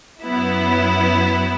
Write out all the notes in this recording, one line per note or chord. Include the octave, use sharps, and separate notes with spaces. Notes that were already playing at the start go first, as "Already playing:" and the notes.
F#2 F#3 B3 E4